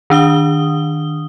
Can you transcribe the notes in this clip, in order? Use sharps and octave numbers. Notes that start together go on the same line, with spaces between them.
D#3 D4 D#6 G7